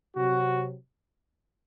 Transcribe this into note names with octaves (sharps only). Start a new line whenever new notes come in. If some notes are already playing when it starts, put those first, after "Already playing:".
C3 F#3 C4 F#4